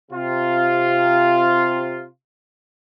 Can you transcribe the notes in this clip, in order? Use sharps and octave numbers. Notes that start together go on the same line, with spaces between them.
C3 F4